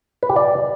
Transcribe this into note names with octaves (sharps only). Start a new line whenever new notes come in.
B4
G4
D5